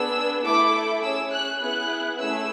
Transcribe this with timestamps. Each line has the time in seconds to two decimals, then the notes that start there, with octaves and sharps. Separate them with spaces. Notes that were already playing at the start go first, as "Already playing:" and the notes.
Already playing: B3 D4 G#4 E6
0.44 A3 E4 A4 D6
1.02 C#4 G#4 E6
1.31 F#6
1.61 B3 E4 G#4 F#6
2.19 A3 C#4 E4 G#4 E6